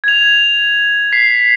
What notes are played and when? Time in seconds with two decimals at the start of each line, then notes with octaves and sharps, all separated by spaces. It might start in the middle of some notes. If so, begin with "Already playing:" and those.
0.04 G#6 F7
1.12 B6 C7